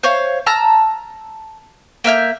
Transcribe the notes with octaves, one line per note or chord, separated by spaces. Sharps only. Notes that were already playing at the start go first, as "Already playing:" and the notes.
C5 C#5 F5
A5 A#5 E6 F6
A#3 E5 F6 G6